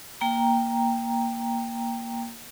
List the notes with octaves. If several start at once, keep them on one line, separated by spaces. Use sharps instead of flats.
A#3 G5 A#5